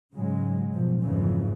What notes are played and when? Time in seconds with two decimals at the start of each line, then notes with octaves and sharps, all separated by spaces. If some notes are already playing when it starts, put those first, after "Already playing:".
0.15 G#2 C#3 F#3 G#3
0.73 F#2 B2 F3
1.03 F#1 F2 G#2 C#3 E3